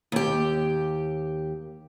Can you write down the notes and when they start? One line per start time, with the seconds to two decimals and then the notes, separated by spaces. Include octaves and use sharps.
0.12 D#2 G4